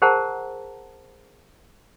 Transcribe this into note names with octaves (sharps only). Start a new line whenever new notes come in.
G#4 A#4 C5 F#5 A5 A#5